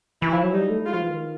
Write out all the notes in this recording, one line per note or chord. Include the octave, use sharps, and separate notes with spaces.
E3 E4
F3
F#3
G3 D#4
A3
G#3 F4
F3
E3
D#3